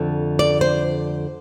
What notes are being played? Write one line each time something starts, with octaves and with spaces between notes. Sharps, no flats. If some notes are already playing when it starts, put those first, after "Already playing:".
Already playing: F2 D3 A3
D5
C5